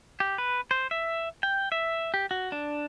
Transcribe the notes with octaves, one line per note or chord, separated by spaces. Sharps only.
G4
B4
C5
E5
G5
E5
G4
F#4
D4